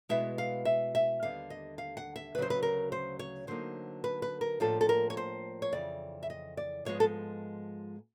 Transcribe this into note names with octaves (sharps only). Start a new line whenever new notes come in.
B2 G#3 B3 E4 E5
F5
E5
E5
D#2 D3 G3 B3 F5
D#5
F5
F#5
E5
D2 C#3 F#3 B4 C5
B4
A#4
C5
C#5
D3 F#3 A#3 D#4 C5
B4
B4
A#4
A2 F3 A#3 D4 F4 A4
A4
A#4
C#5
C5
C#5
F2 C#3 E3 D5
E5
D#5
D5
G#2 F3 G#3 B3 C#5
A4